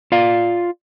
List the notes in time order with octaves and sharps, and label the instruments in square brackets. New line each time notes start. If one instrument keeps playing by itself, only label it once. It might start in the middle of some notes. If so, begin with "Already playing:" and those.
[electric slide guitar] F4 D5 F5